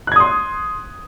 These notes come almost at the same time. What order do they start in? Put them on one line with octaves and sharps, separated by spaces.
F#6 G#6 D#6 C6